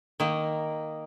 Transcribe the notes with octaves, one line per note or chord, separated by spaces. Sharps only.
D#3 A#3